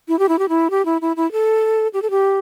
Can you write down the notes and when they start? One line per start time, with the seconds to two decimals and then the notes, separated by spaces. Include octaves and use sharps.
0.08 E4
0.19 G4
0.29 E4
0.39 G4
0.49 E4
0.70 G4
0.85 E4
1.01 E4
1.16 E4
1.32 A4
1.93 G4
2.02 A4
2.10 G4